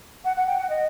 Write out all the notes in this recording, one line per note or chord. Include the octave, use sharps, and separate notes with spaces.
F#5
F#5
G5
F#5
D#5